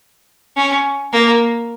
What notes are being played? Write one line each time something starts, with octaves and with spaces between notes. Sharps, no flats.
C#4
A#3